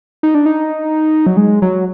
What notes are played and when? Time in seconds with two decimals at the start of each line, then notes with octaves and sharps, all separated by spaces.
0.23 D#4
0.35 D4
0.46 D#4
1.26 F#3
1.37 G#3
1.62 F#3